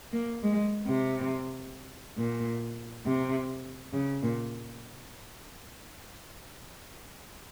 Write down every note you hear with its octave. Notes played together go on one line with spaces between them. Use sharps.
A#3
G#3
C3
A#2
C3
C#3
A#2